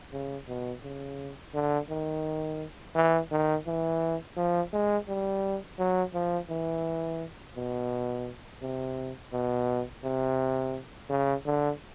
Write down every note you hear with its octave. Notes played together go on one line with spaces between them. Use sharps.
C#3
B2
C#3
D3
D#3
E3
D#3
E3
F3
G#3
G3
F#3
F3
E3
B2
C3
B2
C3
C#3
D3